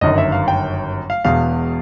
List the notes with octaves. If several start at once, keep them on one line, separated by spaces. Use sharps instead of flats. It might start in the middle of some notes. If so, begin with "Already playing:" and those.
G1 F#2 D#3 D#5
E5
F5
G5
F5
E1 E2 B2 F5